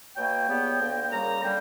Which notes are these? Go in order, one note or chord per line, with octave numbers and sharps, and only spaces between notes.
B2 F#3 A#3 G5
C#2 C#3 G3 B3
D2 D3 A#3
G5
F#2 C#3 G3 A#3 A#5
D3 G3 A#3 G5